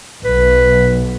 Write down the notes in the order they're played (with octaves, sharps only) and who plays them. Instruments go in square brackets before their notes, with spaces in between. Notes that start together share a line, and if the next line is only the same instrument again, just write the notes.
[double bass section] B1 [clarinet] B4